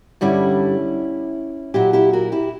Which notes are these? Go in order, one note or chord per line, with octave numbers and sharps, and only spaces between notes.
G2 D3 G3 C#4 E4
A#2 F#3 E4 G4
E4 G4
F#4 A#4
E4 G4